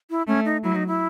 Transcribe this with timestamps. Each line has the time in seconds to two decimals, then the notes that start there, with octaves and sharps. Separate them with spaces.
0.10 E4
0.27 A3 C#4
0.45 D#4
0.63 F#3 E4
0.76 D#4
0.87 E4